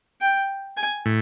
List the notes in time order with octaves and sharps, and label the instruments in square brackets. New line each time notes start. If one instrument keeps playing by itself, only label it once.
[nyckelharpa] G5
G#5
[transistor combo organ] A2